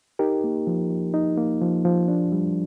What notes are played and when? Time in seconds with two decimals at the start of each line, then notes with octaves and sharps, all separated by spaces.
0.19 D#4 G4 A#4
0.44 A#3
0.67 F3
0.90 F3
1.14 D#4
1.38 A#3
1.62 F3
1.85 F3
2.08 D4
2.32 G3